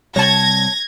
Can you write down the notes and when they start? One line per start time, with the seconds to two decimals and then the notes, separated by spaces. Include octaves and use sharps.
0.16 C3 G3 C#5 A5 G#6 A#6